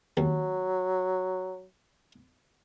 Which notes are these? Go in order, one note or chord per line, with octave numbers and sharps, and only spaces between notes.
D#2 F#3